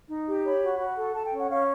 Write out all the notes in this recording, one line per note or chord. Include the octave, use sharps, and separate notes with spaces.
D#4
G4
C#5 B5
F#4
F#4
A4
A4 A5
G5
C#4
F#5
C#4 F5